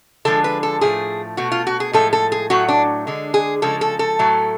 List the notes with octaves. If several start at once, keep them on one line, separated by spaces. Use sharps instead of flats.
D3 F3 G#3 A4
B4
A4
A2 F3 A3 G#4
B2 A3 F#4
F4
F#4
G#4
A2 F3 G#3 A4
A4
G#4
A2 F#3 A3 F#4
D4
D3 G#3
G#4
C#3 F3 G#3 A4
A4
A4
A2 F#3 A3